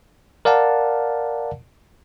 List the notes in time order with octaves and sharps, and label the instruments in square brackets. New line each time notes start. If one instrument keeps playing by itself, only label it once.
[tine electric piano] A#4 D5 F5 F#5 A5